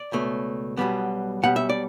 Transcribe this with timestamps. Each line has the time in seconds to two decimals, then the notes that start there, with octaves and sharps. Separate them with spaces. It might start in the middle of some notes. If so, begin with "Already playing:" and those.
Already playing: D5
0.12 C#2 B2 A3
0.77 B1 B2 G3 B3
1.43 B1 B2 G3 B3 F#5
1.56 E5
1.70 D5